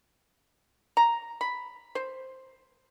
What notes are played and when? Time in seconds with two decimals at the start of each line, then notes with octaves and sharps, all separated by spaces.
0.97 A#5
1.41 B5
1.95 C5